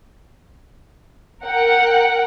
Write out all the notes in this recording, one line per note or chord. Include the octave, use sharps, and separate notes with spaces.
A#4 F#5 G5